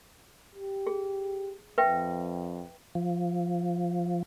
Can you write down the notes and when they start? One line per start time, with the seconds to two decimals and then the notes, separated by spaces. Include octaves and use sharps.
0.55 G4
0.87 G#4
1.78 F2 B4 E5 G5
2.95 F3